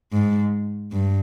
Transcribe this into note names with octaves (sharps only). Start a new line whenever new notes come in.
G#2
G2